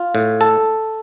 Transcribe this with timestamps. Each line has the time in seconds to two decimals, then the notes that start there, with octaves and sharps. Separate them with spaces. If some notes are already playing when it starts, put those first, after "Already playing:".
Already playing: F4
0.15 A2
0.41 A4